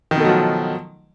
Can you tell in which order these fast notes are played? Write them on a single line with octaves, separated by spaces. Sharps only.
D#3 B2 A3 F#3 F3